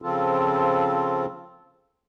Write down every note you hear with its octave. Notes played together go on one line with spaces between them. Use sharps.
C#3 F3 C4 F4 A4